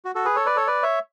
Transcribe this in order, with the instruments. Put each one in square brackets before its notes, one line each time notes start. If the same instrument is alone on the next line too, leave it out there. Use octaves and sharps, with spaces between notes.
[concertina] F#4
F#4 A4
G#4 B4
A4 C#5
B4 D5
A4 C#5
B4 D5
C#5 E5